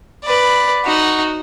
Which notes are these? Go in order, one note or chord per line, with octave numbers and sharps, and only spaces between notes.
B4 D5
D#4 F#4